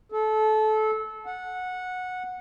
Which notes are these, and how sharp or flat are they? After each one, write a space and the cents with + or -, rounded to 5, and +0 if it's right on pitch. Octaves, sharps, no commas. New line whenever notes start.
A4 -25
F#5 -15